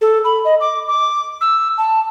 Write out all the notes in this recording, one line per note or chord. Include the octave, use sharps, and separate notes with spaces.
A4
B5
D#5
D6
D6
E6
A5